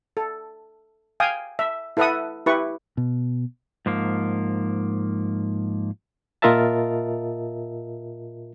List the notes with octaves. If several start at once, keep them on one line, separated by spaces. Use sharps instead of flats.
A4
F5 G5 G#5 D#6
E5
E4 A4 B4 E5 F#5 D#6
E4 G4 B4 C#6
B2
G#2 F3 A#3
A#2 F4 A#4 D#5 E5 A5